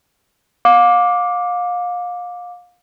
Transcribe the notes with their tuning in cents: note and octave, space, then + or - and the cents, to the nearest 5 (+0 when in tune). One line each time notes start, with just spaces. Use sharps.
F5 +30 D6 +0